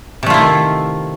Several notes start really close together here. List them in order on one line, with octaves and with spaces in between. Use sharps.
C3 A3 F4 E4 D#3